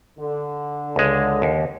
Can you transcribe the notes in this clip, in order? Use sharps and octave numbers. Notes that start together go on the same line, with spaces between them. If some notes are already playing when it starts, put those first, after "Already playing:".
D3
C#2 G#3
D#2